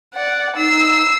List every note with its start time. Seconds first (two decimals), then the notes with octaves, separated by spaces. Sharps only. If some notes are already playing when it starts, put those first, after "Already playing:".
0.15 D5 F#5
0.56 D#4 E6 C7